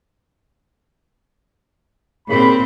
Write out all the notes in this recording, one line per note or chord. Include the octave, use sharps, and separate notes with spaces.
D#2 A#2 C#3 C4 B5